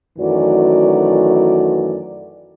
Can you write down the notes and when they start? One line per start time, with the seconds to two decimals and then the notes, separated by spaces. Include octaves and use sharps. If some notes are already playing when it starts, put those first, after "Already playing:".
0.19 F#2 D#3 E3 A3 F#4 D5